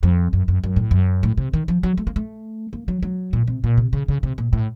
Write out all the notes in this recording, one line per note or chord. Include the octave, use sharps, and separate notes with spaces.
F2
F#2
F#2
F#2
A2
F#2
A2
C3
D#3
F3
F#3
A3
A#3
A3
A#3
F#3
F#3
A#2
C3
A#2
C3
C#3
C#3
C3
A#2
A2